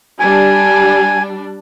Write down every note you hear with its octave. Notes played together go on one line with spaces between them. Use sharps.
G3 D4 G#5